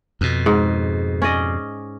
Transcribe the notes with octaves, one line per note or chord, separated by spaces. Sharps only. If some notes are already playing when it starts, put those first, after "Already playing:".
F2 B2
G#2
C#4 D5 D#5